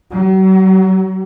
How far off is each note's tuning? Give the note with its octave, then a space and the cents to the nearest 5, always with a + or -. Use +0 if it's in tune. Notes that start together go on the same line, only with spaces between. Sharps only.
F#3 +40